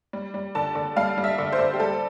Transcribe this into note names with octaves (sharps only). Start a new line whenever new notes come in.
G3
G3
D3 A5
D3
G3 F5
G3
E5
D3
C5
D3
G4
G3 A4